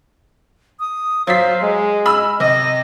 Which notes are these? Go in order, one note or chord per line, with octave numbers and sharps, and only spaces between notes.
D#6
F#3 C5 F5 B6
G#3 D#5
B5 E6 F6
C3 D#5 A#6